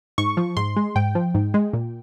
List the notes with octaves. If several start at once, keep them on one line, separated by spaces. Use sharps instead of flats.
G#2 C#6
F3
G#2 C6
G#3
G#2 G5
F3
G#2
G#3
A#2